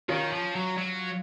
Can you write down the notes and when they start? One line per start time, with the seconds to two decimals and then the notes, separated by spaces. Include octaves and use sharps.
0.09 D#3 C#4 F4
0.33 F3
0.56 F#3
0.78 F#3